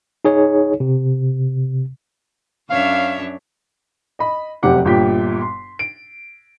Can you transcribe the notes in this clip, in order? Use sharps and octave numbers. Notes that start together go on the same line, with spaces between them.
D#4 G#4 C#5
C3
F#2 D4 C#5 E5 F5
D#5 B5
F1 F#2 C3 G4 F#5 D6
G1 A#2 G4 G5 B6
C6
D7